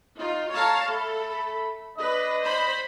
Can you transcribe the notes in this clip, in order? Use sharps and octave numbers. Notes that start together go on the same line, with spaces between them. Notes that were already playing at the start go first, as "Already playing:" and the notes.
D#4 F4
A4 C#5 F5 A5 A#5 C#6
A3 A4 B5
D4 B4 D#5
C5 B5